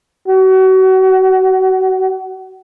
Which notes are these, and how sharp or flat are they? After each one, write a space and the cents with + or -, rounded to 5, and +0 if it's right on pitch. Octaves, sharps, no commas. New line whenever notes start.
F#4 +30